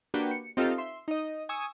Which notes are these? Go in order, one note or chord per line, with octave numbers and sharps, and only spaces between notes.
A#3 D4 F#4 G4 B4 G5
C#7
C4 D#4 F4 G4 A4 F5
E5 C6
D#4 D#5
G#5 C#6 D#6 E6